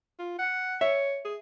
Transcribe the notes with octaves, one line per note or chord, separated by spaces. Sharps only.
F4
F#5
C#5 E5
G#4